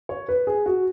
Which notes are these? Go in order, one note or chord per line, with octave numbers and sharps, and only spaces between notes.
C#5
B4
G#4
F#4